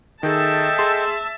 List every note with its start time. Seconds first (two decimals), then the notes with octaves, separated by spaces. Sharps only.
0.23 D#3 G#4 A4 D#5 E5 G5 A5
0.79 G#4 C6